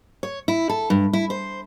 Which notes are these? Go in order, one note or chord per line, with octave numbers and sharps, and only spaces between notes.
C#5
E4
A4
G2
E4
C5